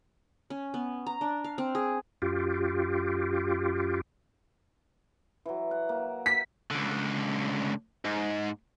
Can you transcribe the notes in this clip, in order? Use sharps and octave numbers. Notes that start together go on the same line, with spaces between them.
C#4
B3
A#5
D4
F5
C4
G#4
F#2 F4 G4
E3 F#3
F#5
A#3
B6
C#2 D3
G#2